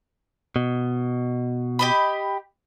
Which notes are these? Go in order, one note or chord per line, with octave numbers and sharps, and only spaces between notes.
B2
G4 D#5 B5